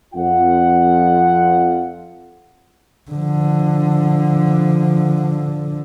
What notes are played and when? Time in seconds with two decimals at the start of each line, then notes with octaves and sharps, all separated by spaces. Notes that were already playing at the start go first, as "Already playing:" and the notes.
0.14 F2 F4 F#5
3.11 D3 F3